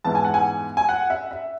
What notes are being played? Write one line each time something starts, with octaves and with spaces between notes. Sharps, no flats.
G#2 E3 B3 E4 A5
G#5
F#5
G#5
G#5
F#5
E5
E5